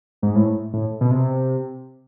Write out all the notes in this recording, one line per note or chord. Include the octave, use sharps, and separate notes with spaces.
G#2
A2
A2
B2
C3